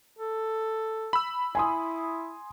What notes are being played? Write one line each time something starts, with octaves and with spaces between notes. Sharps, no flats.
A4
B5 E6
E4 G#5 C6 D#6